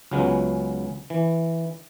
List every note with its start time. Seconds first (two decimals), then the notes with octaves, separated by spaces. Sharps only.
0.11 C#2 C#3 F#3 G#3 B3
1.10 E3